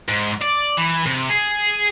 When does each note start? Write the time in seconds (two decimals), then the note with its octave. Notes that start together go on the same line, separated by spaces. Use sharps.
0.09 G#2
0.42 D5
0.77 E3
1.06 C3
1.30 G#4